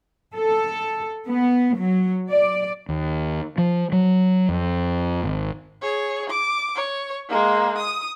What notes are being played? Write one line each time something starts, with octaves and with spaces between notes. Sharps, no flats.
A4
B3
F#3
D5
D#2
F3
F#3
F2
G#1
G#4 C#5
D6
C#5
G#3 A#3
D#6